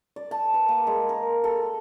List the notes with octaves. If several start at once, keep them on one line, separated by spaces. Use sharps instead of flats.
D5
A5
B4
A#3
G#3
A#4
A4